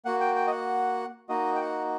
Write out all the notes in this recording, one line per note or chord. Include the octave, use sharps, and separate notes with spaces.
A#3 F#4 F#5
G5
G5
D#5
F#5
A#3 D#4 F#4 D#5
G5
F#5